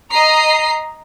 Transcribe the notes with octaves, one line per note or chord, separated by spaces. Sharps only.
D#5 A#5 C7